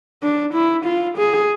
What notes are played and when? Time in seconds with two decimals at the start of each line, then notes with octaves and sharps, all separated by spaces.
0.23 D4
0.54 E4
0.86 F4
1.18 G#4